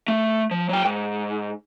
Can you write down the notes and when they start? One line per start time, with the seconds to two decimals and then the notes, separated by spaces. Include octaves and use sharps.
0.08 A3
0.51 F3
0.69 F#3 G5
0.85 G#2